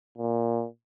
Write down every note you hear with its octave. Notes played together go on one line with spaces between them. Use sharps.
A#2